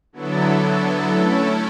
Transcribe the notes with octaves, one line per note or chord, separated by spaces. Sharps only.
D3 F#3 B3 E4 A4
A3 C#4 E4 A4